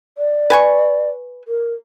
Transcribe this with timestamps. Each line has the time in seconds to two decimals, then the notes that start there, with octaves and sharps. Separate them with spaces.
0.18 D5
0.50 B4 G#5 C#6
1.48 A#4